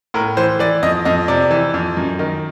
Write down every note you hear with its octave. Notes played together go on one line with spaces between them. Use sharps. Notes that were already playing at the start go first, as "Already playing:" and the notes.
A2 A#4
E3 C5
E3 D5
F2 D#5
F2 D#5
C3 D5
E3
F2
F#2
D#3